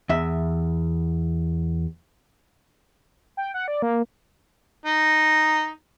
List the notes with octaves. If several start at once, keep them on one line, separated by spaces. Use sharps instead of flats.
E2 E5
G5
F#5
D5
A#3
D#4